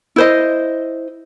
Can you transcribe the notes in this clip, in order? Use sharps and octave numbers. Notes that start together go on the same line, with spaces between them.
E4 C5 D#5